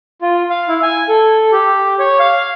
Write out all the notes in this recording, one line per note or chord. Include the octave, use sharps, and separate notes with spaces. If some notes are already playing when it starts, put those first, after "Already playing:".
F4
F5
E4
G#5
A4
G4
C#5
F5